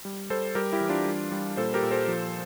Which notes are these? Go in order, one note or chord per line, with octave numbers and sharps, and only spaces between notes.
G3
G3 A4 C5
G3 G4 A#4
E4 G4
E3
D4 F4
G3
G3
A#2 A4 C5
G4 A#4
A#2
A4 C5
F3